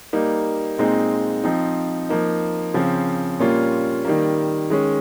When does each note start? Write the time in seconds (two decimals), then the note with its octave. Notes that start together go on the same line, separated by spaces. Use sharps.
0.13 G3 A#3 D#4
0.78 A#2 G#3 C4 D#4
1.44 F3 C4 D#4
2.09 F3 A#3 D#4
2.74 C#3 F3 C4
3.39 A#2 G3 A#3 C#4 F4
4.05 D#3 G3 A#3
4.70 D#3 G#3 C#4